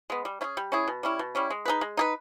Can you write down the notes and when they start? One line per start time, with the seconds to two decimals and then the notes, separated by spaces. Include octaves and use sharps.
0.10 G#3 B3
0.25 G3
0.41 C#4 E4 G#4
0.57 G3
0.72 C#4 E4 G#4
0.88 B2
1.03 G3 C#4 E4
1.19 B2
1.35 G3 C#4 E4
1.50 G#3
1.65 D#4 G#4 B4
1.81 G#3
1.97 D#4 G#4 B4